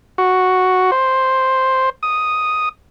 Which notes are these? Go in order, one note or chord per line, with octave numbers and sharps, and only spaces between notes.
F#4
C5
D#6